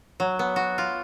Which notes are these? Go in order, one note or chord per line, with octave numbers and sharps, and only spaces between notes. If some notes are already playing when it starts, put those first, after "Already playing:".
F#3
B3
F#4
F4